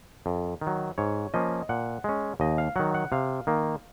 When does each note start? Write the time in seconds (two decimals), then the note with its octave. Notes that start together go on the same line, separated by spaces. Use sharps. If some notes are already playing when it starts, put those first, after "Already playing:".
0.26 F2
0.61 D#3
0.67 F#3
0.98 G#2 C#5
1.34 F3 A#3 C#4 D#5
1.69 A#2 F#5
2.04 G#3 C#4
2.40 D#2 D#5
2.58 F5
2.76 D#3 F#3 F#5
2.94 F#5
3.12 C3 F5
3.47 D#3 A#3